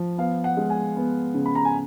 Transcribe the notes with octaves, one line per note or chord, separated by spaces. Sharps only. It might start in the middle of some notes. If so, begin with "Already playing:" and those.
Already playing: F3
B3 F5
F#5
G#3
G#5
B3
C#3
B5
A#5
G#5